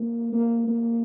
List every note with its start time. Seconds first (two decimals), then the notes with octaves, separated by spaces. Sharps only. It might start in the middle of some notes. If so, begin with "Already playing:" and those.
Already playing: A#3
0.33 A#3
0.68 A#3